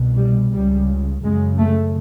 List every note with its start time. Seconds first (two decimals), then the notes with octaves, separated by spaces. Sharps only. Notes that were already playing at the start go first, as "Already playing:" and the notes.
Already playing: C2 B2
0.16 G3
0.52 C#2 C#3 G3
1.22 F#2 C#3 G#3
1.58 A3